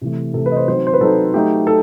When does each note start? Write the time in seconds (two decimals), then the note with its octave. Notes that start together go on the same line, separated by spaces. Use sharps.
0.01 C3 E3 A3
0.34 C3 E3 A3 A4
0.46 B4
0.52 D#5
0.57 C5
0.68 F#3 C4 D#4 C5
0.87 C5
0.94 B4
1.01 F#3 C4 D#4 A4
1.34 F#3 A3 D#4 G4
1.67 A4